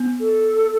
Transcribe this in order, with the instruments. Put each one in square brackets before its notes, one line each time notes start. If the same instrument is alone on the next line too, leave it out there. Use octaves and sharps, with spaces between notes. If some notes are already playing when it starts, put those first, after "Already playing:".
Already playing: [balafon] B3
[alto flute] A4